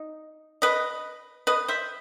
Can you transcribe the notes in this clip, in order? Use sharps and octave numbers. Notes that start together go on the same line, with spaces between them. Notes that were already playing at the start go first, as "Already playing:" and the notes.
Already playing: D#4
B4 D#5
B4 D#5
C5 E5